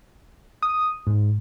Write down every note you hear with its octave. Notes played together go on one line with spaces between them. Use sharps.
D#6
G#2